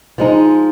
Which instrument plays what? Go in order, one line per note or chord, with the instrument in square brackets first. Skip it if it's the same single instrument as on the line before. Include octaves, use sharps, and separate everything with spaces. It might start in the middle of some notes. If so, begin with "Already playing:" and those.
[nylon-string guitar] F3 G#3 D#4